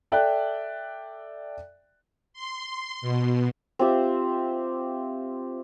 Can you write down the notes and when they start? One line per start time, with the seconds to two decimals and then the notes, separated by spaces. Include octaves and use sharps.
0.12 A4 D5 E5 G5 F#6
2.33 C6
3.01 B2
3.79 C4 F4 G4 E5